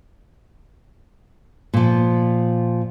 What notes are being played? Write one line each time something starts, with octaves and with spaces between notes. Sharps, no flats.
A#2 F3